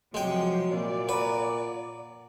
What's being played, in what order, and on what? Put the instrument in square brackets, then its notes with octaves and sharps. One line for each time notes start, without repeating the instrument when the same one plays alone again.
[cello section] C3 F3 [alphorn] F#3 [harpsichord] G#3 G5
[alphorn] A#2 [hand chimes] A#3 F#4 C#5 [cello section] D5
[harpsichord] B4 [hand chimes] F#5 A#5